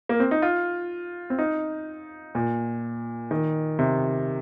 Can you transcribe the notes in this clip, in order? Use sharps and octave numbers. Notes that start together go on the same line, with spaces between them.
A#3
C4
D#4
F4
C4
D#4
A#2
D#3
C3